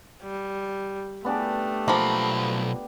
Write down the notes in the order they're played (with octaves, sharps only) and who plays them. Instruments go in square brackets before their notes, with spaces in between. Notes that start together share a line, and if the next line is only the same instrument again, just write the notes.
[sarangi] G3
[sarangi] A3 [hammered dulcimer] B3 D4 G4
[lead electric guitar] B1 B5 [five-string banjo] F3 A#3